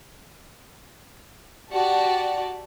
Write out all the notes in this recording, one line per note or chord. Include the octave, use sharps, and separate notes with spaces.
F#4 G4 D5 A5